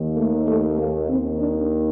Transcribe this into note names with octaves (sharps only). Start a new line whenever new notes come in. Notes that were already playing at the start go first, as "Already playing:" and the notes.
Already playing: D#2 D#3
A3
A3
A#3
D#2 D#3 C4
D4